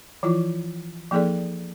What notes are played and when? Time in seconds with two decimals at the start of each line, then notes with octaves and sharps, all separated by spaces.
0.23 E3 F3 E4 F4
1.11 F3 A#3 D#4 G#4 A4 D5